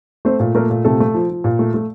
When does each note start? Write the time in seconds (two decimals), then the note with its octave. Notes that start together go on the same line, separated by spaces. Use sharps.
0.25 A3 C4 C5
0.40 A#2
0.55 A3 A#3 A#4
0.70 A#2
0.84 C3 A3 A4
1.00 A3
1.14 F3
1.30 F3
1.44 A#2
1.59 A3
1.74 A3